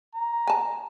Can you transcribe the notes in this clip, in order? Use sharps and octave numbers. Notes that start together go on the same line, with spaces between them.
A#5
G#5 A5